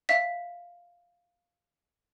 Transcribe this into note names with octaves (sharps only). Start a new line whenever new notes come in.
E5 F5 B6